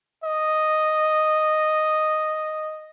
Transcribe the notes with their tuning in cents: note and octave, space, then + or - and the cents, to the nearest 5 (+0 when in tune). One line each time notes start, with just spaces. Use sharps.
D#5 -5